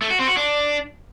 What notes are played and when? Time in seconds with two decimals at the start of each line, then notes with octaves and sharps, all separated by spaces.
0.02 A3
0.10 F#4
0.19 C4
0.28 F#4
0.37 D4